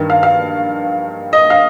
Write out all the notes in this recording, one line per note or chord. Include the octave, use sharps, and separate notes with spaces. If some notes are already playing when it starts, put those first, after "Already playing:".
Already playing: G2 D#3
F5
F5
D#5
F5